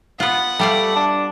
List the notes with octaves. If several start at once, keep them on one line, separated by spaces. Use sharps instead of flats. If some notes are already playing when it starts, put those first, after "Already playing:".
B3 F4 F#5
G3 A3 D5 F5
D4